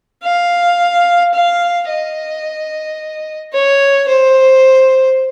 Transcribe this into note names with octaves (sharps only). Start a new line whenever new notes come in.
F5
F5
D#5
C#5
C5